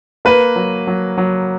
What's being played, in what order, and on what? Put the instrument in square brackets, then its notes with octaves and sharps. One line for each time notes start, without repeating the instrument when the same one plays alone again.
[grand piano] A#3 [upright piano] B4
[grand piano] F#3
F#3
F#3